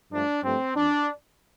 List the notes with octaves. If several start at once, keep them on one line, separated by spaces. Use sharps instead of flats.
G2 F3 A3 D4
G2 F3 A3 C4
F2 D4